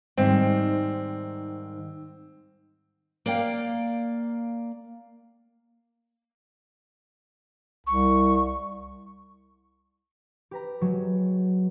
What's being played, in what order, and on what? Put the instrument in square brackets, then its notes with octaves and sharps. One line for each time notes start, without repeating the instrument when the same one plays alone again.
[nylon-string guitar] G#2 D#3 G3 [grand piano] C4
[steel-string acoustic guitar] A#3 D5 F5 G5
[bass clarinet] C2 [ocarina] C#6
[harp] G4 B4 A#5
F#3 G#3